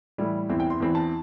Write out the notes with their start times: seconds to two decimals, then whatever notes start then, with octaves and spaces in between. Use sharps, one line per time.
0.18 A2 E3 G3 E4
0.49 E2 E3 C4 E4
0.60 G5
0.70 C6
0.80 E2 E3 C4 E4
0.95 A5